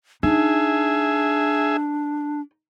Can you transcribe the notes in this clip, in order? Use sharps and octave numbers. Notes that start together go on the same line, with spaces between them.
D4 D#4 G#4 E5